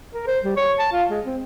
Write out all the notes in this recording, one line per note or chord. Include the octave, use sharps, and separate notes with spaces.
A#4
C5
G3
C#5
A5
F4
G#3
C4